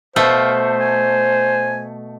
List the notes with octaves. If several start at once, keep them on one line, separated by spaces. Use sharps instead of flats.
B2 A3 C5 F5
G#5